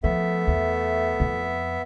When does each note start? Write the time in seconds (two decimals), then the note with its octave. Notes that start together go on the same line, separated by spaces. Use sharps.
0.04 F3 A3 B3 E5
0.47 E2
1.20 F2